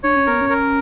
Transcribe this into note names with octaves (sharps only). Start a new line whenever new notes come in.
D4 C#5
C#4
B3 A#4
C#4
A#4